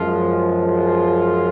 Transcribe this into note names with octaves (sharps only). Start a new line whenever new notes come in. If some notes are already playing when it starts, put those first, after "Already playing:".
Already playing: F#2 F3 G#3 F4
F4